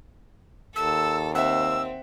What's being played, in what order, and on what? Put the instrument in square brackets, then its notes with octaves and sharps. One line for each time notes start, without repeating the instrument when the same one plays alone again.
[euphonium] D#2 [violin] A4 [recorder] E6
[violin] C4 [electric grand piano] E5 F#5 [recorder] E6